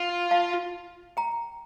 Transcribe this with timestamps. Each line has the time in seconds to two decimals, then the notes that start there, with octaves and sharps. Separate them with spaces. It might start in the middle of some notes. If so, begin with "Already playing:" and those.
Already playing: F4
0.31 F5 A5
1.17 G5 A#5